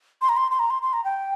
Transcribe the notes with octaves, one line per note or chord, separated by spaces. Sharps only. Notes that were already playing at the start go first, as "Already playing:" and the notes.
C6
A#5
C6
C6
A#5
C6
C6
A#5
G5